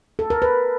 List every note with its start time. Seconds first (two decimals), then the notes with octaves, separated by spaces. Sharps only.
0.19 A4
0.30 A#4
0.42 B4